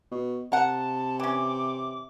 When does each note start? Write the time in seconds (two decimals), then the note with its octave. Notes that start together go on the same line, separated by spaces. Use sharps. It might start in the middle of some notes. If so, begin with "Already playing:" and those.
0.11 B2
0.52 C3 A#4 F#5 A5
1.20 E3 C#4 D6